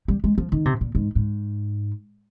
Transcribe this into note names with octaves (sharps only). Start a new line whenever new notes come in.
G3
G#3
F3
D#3
C3
A#2
G#2
G#2